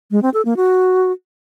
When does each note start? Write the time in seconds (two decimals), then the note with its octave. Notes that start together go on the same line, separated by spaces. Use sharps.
0.11 G#3
0.22 C4
0.34 A4
0.45 A#3
0.56 F#4